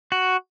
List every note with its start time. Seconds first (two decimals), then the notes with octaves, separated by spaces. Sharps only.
0.12 F#4